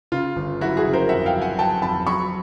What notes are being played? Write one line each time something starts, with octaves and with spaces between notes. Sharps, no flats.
C#3 F4
G1
F#3 E4 F#4
F#4 G#4
C#3
A#4 C5
F2 E5 F#5
F5 G5
F#3
F#5 G#5
F#3 G5 A5
F2 A5 B5
F#3 B5 C#6